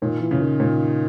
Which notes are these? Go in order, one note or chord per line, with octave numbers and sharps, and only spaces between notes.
A#2 D#3
E3
C#3
D#3
A#2